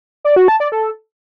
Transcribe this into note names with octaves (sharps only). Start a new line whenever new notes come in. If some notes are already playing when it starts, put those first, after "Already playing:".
D5
F#4
A5
D5
A4